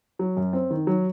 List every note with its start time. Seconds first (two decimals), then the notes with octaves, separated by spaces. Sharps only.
0.19 F#3
0.37 F#2
0.53 C4
0.70 D#3
0.87 F#3